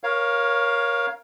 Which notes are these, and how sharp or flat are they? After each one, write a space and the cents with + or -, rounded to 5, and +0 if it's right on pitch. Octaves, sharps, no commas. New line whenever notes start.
A#4 +20 C#5 +0 F5 +0